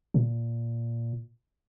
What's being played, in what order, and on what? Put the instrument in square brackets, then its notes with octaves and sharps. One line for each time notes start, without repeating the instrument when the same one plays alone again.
[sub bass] A#2